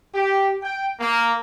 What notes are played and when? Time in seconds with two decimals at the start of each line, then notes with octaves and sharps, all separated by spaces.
0.14 G4
0.62 G5
1.00 A#3